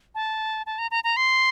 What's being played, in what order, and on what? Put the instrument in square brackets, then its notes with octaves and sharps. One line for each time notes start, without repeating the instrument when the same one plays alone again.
[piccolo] A5
A5
A#5
A#5
A#5
C6